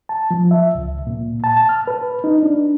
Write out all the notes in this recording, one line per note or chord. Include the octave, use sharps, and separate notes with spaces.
A5
F3
E5
C#2
A#2
A5
A5
F6
B4
D#4
D4